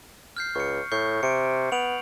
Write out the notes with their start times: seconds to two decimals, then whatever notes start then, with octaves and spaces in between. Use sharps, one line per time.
0.37 F6 G6 C7
0.55 C#2 C#6 C#7
0.91 A2 C#6 G6 C7
1.23 C3 C#7 D7
1.72 B3 D7 F7 F#7